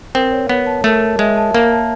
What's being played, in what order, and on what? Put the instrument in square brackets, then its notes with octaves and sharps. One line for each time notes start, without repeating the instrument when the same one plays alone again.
[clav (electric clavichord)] C4 [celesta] A#4
[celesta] C#5
[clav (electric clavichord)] B3 [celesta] C#5
[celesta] A5
[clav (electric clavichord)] A3 [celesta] A#4
[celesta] A5
[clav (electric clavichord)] G#3 [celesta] E5
[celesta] A5
[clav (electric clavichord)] A#3 [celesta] A#4
[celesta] A5